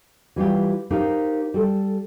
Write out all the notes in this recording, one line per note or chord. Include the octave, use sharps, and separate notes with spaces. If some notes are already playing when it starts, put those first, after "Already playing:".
E3 G3 F4 G4
D#4 G4 A#4 C5 F5
G3 A4